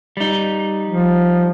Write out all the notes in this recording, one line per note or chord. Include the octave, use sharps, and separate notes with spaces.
G3 D#4
F3